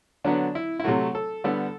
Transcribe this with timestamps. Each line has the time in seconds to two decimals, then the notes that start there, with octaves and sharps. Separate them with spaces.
0.24 D3 F#3 B3 D4
0.55 E4
0.80 E4
0.84 C3 F#3 A3 F#4
1.15 A4
1.44 D3 G3 B3 A4